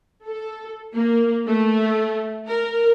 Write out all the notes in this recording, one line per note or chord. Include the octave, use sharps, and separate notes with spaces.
A4
A#3
A3
A#4